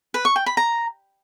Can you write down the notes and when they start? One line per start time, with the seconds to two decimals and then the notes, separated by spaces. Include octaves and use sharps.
0.14 B4
0.25 C#6
0.36 G5
0.46 B5
0.57 A#5